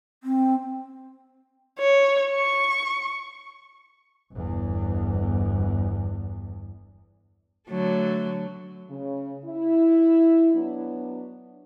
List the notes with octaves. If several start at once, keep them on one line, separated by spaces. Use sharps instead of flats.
C4
C#5
C#6
G1 E2
D3 F#3 A3
C#3
E4
F#3 B3 D4